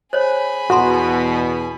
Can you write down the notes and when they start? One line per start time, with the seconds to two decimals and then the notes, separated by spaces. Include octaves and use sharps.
0.13 G#4 C5 C#5 B5
0.70 E2 B2 F#4 A4 F#5 A#5 C6